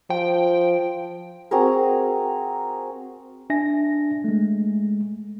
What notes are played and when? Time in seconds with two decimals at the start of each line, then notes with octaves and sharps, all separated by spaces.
0.10 F3 G5
1.51 C4 F#4 G#4 A#4
3.50 D4 E5 G#5 A#6
4.24 G#3 A3